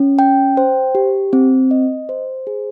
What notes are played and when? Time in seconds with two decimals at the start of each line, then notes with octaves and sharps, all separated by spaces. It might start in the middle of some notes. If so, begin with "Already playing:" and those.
Already playing: C#4
0.19 G5
0.57 C5
0.95 G4
1.33 C4
1.71 D#5
2.09 C5
2.47 G#4